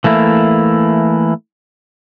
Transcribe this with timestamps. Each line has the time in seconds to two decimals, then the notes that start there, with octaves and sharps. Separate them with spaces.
0.04 E3 A3 A#3 E4